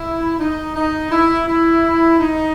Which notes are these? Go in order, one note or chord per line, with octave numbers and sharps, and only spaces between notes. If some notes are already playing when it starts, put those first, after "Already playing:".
Already playing: E4
D#4
D#4
E4
E4
D#4